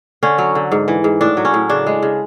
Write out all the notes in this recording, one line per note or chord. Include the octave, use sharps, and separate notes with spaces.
D3 C#4
F#3
D3
G#2
E3
G#2
A2 D4
F#3
C#4
A2
C#3 D4
G#3
C#3